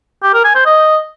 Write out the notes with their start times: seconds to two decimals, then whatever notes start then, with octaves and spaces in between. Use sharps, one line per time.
0.23 G4
0.34 A#4
0.44 G#5
0.55 C5
0.66 D#5